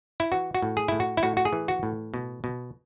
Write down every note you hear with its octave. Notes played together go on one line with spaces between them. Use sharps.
E4
E3 F#4
F#4
A2
G#4
A2 E4
F#4
E4
A2 F#4
F#4
G#4
E3
F#4
A2
B2
B2